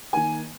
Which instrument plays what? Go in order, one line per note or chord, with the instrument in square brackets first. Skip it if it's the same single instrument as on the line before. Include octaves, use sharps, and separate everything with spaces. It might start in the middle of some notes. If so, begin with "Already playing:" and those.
[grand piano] D#3 A#3 G#5